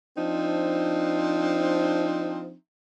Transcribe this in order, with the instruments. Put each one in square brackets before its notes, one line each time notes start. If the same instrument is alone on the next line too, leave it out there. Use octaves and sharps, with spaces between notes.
[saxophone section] F3 C4 D4 D#4